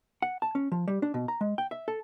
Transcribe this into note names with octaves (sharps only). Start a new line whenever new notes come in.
F#5
A5
C#4
F3
G3
D4
B2
A#5
G#3
G5
E5
A4